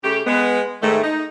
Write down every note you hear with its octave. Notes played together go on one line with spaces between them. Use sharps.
C#3 A3 G4
G#3 B3
G#2 D#3 A3
D#4